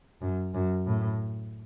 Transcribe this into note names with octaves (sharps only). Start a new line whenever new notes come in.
F#2
F#2
A2